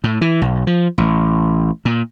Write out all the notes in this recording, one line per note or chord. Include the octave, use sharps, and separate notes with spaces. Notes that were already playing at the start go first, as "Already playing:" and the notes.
A2
E3
B1
F3
A1
A#2